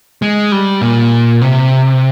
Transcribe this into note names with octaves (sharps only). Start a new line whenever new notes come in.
G#3
G3
A#2
C3